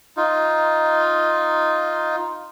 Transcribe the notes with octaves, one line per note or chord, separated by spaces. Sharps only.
D#4 F4